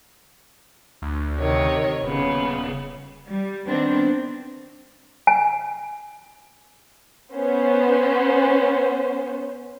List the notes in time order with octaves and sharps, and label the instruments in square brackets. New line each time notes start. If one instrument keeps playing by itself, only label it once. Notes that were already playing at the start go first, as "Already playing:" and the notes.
[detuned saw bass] D2
[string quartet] C3 D#3 C#5
[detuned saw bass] D#1 [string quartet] C#3 B3
[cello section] G3
D#3 B3 C4 D4
[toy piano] G#5
[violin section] B3 C#4 C5